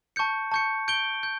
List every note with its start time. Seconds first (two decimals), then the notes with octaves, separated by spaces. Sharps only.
0.16 A5 C#6 G6 C#7
0.52 A5 C#6 G6 C#7
0.88 G6 D7 G7
1.23 G6